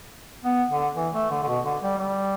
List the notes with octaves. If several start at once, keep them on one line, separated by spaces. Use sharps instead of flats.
B3
D3
E3
A3
D3
D3
B2
D3
G3
G3